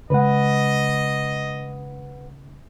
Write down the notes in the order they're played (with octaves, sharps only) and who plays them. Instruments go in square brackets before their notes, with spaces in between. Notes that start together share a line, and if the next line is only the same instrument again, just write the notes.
[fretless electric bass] C#3 G#3 [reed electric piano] B4 F#5 [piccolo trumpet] D#5